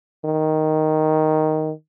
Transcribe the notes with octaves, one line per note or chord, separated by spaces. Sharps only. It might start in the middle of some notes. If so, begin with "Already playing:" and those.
D#3